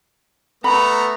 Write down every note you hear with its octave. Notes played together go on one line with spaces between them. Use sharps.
A3 B3 A#5 B5